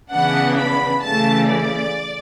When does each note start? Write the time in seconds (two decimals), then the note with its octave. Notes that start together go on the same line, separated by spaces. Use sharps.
0.12 C#3 E3 B3 D4 F#5
0.59 B5
1.04 C#3 E3 A3 A5
1.49 D5